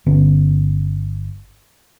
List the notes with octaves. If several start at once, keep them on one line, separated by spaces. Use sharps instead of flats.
G1 D3 B3 C#4